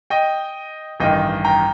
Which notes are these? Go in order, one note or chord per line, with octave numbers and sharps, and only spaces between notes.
D#5 G5
A1 G2 D#3 D#5 G5
G5 A#5